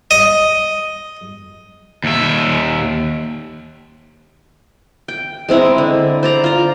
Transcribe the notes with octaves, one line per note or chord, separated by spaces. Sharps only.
D#5
D#2 E5
G5
G#3 C4 E4 A#5
D3
C5 D5 A#5
F4 A#5